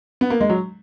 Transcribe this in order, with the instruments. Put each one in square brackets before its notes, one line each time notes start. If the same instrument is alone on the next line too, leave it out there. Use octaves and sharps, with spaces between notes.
[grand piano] B3
A#3
G#3
F#3